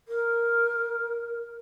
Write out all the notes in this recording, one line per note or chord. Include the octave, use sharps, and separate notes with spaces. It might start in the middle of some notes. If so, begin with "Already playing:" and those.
A#4